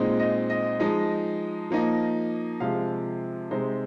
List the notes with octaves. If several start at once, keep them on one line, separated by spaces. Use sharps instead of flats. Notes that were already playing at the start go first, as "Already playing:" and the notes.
Already playing: A#2 G#3 C4 D#4
D#5
D#5
F3 G#3 D#4
F3 A#3 D#4
C3 F3 G#3 F5
C3 G#3 D#4 C5